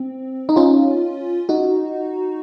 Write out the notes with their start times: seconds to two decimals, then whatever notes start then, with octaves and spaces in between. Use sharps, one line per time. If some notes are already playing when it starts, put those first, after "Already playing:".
Already playing: C4
0.49 D#4
0.56 C#4 F4
1.49 D#4 F#4